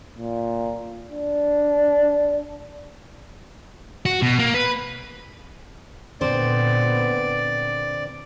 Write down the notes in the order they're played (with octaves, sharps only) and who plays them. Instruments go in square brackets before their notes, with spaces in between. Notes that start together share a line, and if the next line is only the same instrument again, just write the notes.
[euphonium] A#2
D4
[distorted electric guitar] F#4
B2
A#3
B4
[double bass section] A#2 B3 [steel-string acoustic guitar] D3 C4 C5 [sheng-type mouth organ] D5